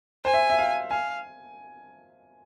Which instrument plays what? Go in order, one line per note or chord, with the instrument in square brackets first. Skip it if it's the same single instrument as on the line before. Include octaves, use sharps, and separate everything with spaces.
[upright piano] C5 [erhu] G#5
[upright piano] E5
E5
F5
[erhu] F5 [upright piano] G#5